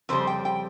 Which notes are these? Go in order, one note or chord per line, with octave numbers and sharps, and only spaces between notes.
F2 C#3 G3 C5
G5
G5